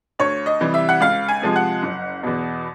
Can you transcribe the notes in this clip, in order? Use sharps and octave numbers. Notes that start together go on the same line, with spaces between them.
D2 C#5
D#5
C3 E3 G3
E5
F#5
C#2 F5
G#5
C3 F3 G#3
F#5
F#1
E2 B2